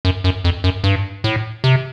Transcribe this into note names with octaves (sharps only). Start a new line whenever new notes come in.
F#2
F#2
F2
F#2
G2
A2
C3